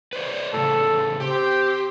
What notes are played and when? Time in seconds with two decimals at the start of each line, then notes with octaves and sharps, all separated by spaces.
0.13 B4 C5 D5
0.54 A2 C#3 A4
1.20 C4 G4